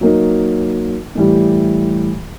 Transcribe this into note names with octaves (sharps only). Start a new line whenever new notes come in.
F#3 A#3 D#4
A2 E3 G3